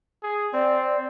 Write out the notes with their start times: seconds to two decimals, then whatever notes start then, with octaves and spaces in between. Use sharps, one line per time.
0.23 G#4
0.54 C4 D5